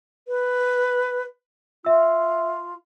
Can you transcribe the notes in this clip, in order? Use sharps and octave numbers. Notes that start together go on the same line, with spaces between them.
B4
F4 E5 E6